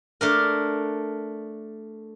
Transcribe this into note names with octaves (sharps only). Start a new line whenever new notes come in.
A3 D4 A#4